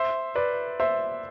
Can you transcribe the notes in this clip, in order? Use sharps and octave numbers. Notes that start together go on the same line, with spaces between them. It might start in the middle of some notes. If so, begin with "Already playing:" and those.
Already playing: C5 E5
B4 D5
C5 E5